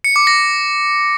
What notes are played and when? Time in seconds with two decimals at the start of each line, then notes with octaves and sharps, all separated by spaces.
0.04 C#7
0.16 D6
0.27 A#6